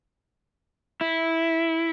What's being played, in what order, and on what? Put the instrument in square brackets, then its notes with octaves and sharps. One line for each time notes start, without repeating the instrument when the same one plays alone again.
[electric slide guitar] E4